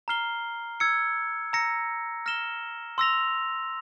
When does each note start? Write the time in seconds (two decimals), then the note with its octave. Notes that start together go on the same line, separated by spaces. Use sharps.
0.08 A#5 F6 C7 G7
0.80 E6 G#6 C#7
1.53 A#5 E6 A#6 C#7
2.26 F6 A#6 E7 G7
2.98 C6 E6 A#6 F7